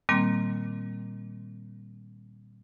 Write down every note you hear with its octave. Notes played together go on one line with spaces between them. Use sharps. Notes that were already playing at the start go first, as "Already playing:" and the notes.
A#2 D#3 G3 A#3 C4